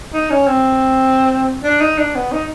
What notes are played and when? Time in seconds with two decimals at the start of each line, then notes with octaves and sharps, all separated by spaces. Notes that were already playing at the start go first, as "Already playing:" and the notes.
0.14 D#4
0.30 C#4
0.47 C4
1.64 D4
1.80 D#4
1.98 D4
2.15 B3
2.32 D#4